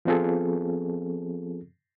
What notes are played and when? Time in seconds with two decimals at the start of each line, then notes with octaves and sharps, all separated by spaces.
0.05 F3 B3 C4 F4 G#4 A4